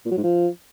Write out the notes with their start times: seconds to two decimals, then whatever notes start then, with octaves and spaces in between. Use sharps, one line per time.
0.05 A#2
0.11 F#3
0.17 G#2
0.24 F3